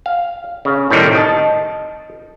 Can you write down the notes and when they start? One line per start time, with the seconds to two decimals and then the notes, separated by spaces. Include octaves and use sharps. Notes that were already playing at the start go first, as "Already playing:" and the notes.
0.06 F5
0.65 C#3
0.91 A2 C3 D#3 G3
1.15 D#5 A5